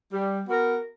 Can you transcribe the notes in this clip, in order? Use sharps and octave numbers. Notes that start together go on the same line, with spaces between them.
G3
B3 F#4 A#4